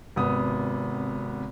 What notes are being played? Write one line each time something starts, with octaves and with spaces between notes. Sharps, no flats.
G#1 C3 B3 D#6